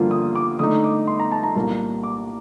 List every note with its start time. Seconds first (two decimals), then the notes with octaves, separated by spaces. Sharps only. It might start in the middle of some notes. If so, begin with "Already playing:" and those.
Already playing: G2 D3 F3 A#3 F4
0.11 D#6
0.35 D6
0.59 D3 A3 D#4 D#6
0.84 D6
1.07 C6
1.20 A#5
1.32 A5
1.43 A#5
1.55 C2 A#2 G3 A#3 A#5
2.03 D6